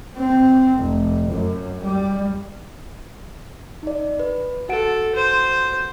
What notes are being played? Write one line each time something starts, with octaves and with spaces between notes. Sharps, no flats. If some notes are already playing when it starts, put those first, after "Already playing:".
C4
F1
F#2
G3
D#4 D5
B4
F#4 A4 F#5 D7
C5